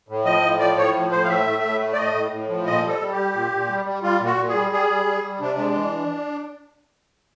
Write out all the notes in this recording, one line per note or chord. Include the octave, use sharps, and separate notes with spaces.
A2
F3 D#5
A2
F3 D5
A2 C#5
F3
A2 C5
F5
A3 E5
A2
A2
A3
D5
A2 D#5
A2
A2
F3
A#2 D#5
G3 A4
G3
G3 G4
A#2
A#2
G3
G3
G3 F4
A#2
F#4
A#2
G#4
G3
G3 G#4
G3
G3
G3
C3 D4
G#3
E3